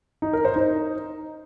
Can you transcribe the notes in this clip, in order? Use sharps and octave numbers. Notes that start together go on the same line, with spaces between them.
D#4
A#4
C5
D#4